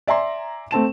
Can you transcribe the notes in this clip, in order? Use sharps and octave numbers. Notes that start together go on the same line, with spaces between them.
D5 E5 G#5 A#5 C6
A3 C4 A5 E7